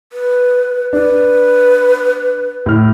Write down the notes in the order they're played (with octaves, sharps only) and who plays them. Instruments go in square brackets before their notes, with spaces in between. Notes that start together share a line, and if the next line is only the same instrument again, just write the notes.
[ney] B4
[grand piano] D4 [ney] B4
[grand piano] A2 F6